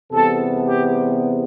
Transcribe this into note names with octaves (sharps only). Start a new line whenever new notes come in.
E2 C3 G3 B3 A4
G4